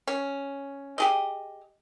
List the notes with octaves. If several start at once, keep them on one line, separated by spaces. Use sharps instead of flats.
C#4
G4 G#4 D#5